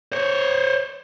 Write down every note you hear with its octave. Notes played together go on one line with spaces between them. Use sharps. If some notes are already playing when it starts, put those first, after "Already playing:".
C5 C#5